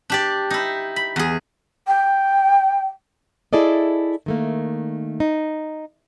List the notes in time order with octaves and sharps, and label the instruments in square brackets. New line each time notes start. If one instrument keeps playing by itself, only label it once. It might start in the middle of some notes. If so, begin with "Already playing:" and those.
[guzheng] D4 G4 D5
D#4 E4
B5
E2 G#4
[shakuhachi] G5
[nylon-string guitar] E4 G#4 A4 D5 D#5
D#3 A3 A#3
D#4